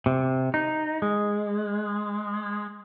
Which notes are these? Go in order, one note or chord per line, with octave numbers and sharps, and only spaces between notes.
C3
D#4
G#3